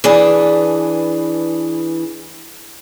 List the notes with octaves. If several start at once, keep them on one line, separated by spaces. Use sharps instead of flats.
E3 D4 G#4 B4